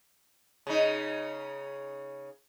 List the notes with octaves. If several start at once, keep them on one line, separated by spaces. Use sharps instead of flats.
C#3 D#4